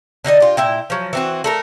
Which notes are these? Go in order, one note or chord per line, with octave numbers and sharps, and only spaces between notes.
D3 D#4 F#4 D#5
F4 G4
A#2 E4 G5
F3 F#3
E3 C4 F#4
A3 A4 A#4